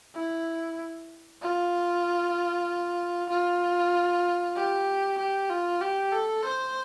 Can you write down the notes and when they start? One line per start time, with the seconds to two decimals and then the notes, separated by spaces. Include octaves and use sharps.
0.15 E4
1.42 F4
3.29 F4
4.56 G4
5.18 G4
5.50 F4
5.82 G4
6.12 A4
6.45 C5